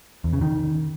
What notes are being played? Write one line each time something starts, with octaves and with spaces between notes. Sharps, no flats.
E2
C#3
D#3